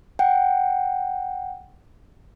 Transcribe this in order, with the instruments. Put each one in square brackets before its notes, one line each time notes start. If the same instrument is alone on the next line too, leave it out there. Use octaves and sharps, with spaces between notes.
[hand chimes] F#5 G5